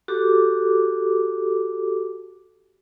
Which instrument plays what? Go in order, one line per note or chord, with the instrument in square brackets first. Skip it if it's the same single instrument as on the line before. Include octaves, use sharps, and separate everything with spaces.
[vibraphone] F#4 G4 A4 D6